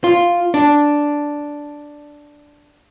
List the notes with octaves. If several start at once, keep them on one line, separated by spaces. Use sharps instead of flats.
F4
D4